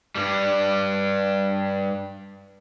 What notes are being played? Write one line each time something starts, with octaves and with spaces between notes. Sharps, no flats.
G2 G3